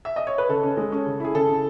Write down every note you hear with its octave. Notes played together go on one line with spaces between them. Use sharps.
E5
D#5
C#5
B4
C#3 A4
C#4
G#3
C#4
C#3
E4 G#4
C#3 A4
C#3